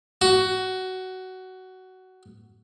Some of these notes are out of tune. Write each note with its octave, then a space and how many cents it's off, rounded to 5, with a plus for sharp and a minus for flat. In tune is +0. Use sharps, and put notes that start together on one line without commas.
F#4 +15